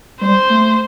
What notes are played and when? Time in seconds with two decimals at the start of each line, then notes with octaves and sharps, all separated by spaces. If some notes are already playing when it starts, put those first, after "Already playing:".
0.21 G3 C5
0.50 A3